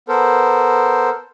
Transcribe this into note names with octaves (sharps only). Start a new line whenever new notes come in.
B3 A4 A#4 C5